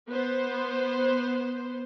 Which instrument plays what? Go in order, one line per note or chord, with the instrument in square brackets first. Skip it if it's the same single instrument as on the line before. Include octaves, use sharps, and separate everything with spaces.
[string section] B3 C5